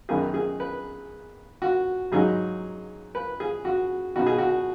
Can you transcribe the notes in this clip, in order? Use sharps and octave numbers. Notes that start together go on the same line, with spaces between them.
F#2 D#3 B3 D#4 G#4
G#4
B4
F#4
G#2 F#3 D#4 G#4
B4
G#4
F#4
B2 B3 D#4 F#4
G#4
F#4